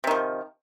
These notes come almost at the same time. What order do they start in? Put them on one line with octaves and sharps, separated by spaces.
C3 D#3 F3